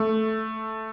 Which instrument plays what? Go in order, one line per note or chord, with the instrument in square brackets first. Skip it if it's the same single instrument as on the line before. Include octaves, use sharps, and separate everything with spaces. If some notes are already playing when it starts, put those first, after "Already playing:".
Already playing: [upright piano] A3